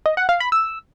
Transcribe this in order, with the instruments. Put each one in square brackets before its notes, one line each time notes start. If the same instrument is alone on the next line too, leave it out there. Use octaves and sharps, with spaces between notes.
[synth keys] D#5
F#5
F5
B5
E6